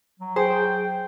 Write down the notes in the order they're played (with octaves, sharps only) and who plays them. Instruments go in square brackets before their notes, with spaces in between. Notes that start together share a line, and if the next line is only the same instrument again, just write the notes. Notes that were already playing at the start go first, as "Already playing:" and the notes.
[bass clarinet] F#3
[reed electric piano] G#4 [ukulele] C5 [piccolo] G5